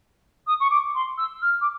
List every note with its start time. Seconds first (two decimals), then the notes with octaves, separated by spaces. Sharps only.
0.46 D#6
0.60 C#6
0.70 D6
0.95 C6
1.17 E6
1.41 F6
1.61 D6